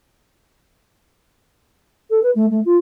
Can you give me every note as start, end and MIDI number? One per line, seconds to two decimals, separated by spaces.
2.10 2.20 69
2.23 2.30 71
2.35 2.46 57
2.50 2.60 57
2.65 2.77 65